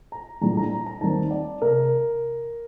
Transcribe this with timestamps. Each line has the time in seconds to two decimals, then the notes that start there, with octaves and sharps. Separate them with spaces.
0.12 A#5
0.41 A#1 A2 G3 D4 A#5
0.57 A#5
0.72 A#5
0.86 A#5
1.01 D#2 D#3 G3 C4 A5
1.31 D5
1.62 C3 A#4